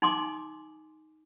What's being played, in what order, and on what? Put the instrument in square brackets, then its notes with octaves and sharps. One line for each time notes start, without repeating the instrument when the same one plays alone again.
[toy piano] D#4 G#5 C6 D6 D#6